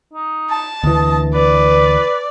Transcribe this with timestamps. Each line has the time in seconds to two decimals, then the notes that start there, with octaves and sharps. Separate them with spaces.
0.14 D#4
0.50 A5
0.84 D2 E3 D#5
1.34 B4 D5